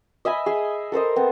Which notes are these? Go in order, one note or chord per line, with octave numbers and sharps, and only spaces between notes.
D#5 E5 G#5 B5
G#4
A4 A#4 C5 D#5
B3 C4